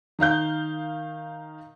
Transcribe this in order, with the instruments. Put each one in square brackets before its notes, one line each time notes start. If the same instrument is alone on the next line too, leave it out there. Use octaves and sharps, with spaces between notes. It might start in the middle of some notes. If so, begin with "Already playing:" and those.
[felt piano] D#3 D#4 F5 G6